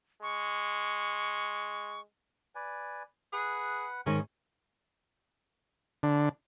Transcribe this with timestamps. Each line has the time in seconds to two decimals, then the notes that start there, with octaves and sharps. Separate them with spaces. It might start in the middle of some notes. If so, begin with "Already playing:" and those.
0.23 G#3 C#6
2.55 B4 D5 G#5
3.33 G#4 B4 F#5
4.06 G#2 D#3 C#4 G#4
6.03 D3